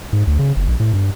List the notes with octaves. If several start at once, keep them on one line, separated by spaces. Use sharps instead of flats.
G#2
D2
C#3
F#1
A#1
A2
G2